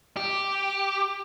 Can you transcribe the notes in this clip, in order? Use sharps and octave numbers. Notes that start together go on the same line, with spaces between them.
G4